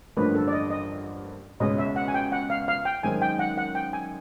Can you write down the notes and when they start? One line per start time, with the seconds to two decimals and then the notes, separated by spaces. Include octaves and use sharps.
0.17 A1 G2 D3 F3 A#3 B4
0.35 A4
0.48 D5
0.53 D#5
0.70 D#5
1.60 C#2 B2 G#3 C#4 D#5
1.78 E5
1.96 F#5
2.08 G#5
2.14 G5
2.32 F#5
2.50 F5
2.68 F5
2.85 G5
3.03 F#2 D#3 G#3 C4 D#4 G#5
3.22 G5
3.39 F#5
3.58 F#5
3.75 G5
3.93 G#5